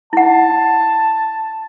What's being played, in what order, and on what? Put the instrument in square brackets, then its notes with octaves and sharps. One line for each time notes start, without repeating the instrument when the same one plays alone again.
[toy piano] E4 F#5 [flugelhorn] A5